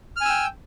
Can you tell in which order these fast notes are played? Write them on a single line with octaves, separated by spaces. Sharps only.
F6 G#5 E6 G5